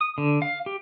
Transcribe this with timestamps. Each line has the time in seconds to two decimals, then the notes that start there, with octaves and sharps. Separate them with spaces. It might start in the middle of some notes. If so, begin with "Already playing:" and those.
0.01 D#6
0.18 D3
0.42 F5
0.66 G4